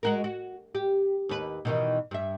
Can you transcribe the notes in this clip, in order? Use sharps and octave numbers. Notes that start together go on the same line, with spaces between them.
G#3 F#4 A#4
F#4
G4
D#2 B4
B2 D#3 E3
G2 E5